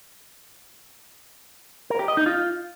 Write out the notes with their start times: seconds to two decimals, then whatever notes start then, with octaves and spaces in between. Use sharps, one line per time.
1.90 A#4
1.99 G4
2.08 D#5
2.17 D#4
2.26 F4